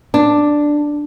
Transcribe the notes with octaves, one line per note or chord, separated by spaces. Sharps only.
D4